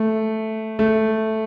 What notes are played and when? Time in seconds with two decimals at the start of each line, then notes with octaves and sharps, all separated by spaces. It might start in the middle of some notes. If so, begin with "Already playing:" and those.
Already playing: A3
0.79 A3